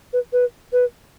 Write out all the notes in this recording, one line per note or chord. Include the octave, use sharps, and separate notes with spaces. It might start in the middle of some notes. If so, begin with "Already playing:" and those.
B4
B4
B4